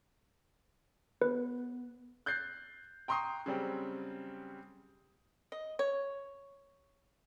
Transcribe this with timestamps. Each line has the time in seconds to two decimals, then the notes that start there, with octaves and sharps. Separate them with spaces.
1.22 B3 B4
2.26 F#6 G6 A6 C7
3.08 G5 A#5 C6 C#6 D#6 C7
3.46 C#3 F#3 G3 C4
5.52 D#5
5.79 C#5